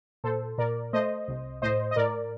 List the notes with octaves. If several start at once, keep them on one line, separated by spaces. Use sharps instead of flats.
A#2 A4 C5
A#2 A#4 D5
A3 C5 D#5
C2
A2 C5 D#5
D#5
A2 A#4 D5